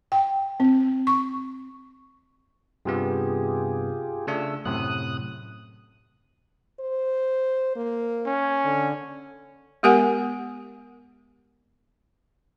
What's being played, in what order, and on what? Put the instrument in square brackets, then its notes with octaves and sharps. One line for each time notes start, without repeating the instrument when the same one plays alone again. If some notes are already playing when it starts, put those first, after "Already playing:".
[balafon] G5
C4
C#6
[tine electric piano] G2 C3 B3 [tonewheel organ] F4 G4 G#4
[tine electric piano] C#3 A3 D4 [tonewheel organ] E6
[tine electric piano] F#2 A2 C3 [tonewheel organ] D#6 F#6
[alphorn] C5
A#3
[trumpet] C#4
[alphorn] D3
[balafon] G#3 B3 G4 A#4 F#5 G#5